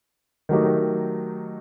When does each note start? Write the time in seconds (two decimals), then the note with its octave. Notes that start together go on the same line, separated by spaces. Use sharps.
0.49 D#3 F#3 A3 D#4 G4